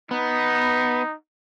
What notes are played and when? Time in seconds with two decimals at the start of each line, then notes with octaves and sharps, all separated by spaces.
0.11 B3 D#4